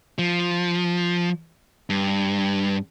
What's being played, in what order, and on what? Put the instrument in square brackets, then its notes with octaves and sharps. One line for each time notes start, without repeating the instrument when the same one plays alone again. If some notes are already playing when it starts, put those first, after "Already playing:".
[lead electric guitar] F3
G2